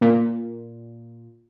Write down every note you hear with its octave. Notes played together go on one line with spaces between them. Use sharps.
A#2